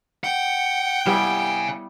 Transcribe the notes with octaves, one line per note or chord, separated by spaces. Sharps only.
F#5 G5
G3 B3 E4 F5 G#5